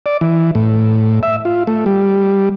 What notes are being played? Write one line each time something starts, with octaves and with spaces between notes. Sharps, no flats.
D5
E3
A2
E5
F4
A3
G3